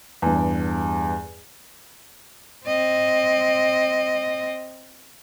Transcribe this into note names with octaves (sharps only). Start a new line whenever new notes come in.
E2 G2
C4 D#5